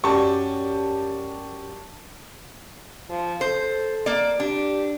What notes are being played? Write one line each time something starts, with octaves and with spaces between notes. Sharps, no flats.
F#2 G4 D5 A5 C#6
F3
A4 C5
A#3 D5
D4 G4